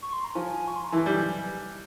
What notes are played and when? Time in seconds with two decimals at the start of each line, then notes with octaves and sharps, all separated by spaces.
0.02 C#6
0.13 C6
0.24 A#5
0.35 F3 G#5
0.68 C#6
0.76 C6
0.84 A#5
0.92 E3 G#5
1.06 G3